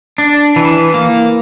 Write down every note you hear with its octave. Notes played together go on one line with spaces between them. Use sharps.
D4
E3
A#3